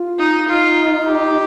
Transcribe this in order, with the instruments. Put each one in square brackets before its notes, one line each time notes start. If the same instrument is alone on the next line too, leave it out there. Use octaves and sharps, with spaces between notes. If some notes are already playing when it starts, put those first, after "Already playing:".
Already playing: [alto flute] F4
[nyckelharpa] D#4
[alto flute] D#4 [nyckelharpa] F4
[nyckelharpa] G4